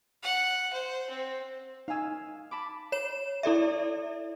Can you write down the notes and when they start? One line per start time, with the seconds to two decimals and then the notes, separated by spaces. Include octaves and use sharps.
0.22 F#5
0.73 C5
1.10 C4
1.88 D#4 F5 G#5 E6
2.51 A5 B5 D6
2.92 C#5 E7
3.43 E4 A4 D5 E5